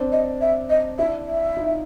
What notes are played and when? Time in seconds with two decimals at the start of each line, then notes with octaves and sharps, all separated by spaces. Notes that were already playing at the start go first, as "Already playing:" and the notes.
Already playing: C4 D4
0.12 D#5
0.41 E5
0.70 D#5
0.99 D4 E4 E5
1.28 E5
1.57 D#4 F4